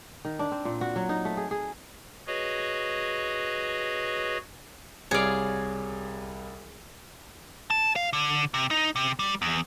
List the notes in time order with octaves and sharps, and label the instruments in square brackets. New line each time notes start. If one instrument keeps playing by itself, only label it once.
[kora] D#3
D4
C4
A#2
F#4
F#3
D#4
A3
G#4
G#4
[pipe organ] F#4 G#4 B4 C#5 D#5
[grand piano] C2 G3 [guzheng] G#4 F5 [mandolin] C#5 D5
[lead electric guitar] A5
F5
D3
C3
D#4
C3
G3
E2